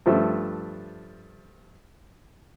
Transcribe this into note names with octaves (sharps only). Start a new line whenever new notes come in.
G2 F3 A3 E5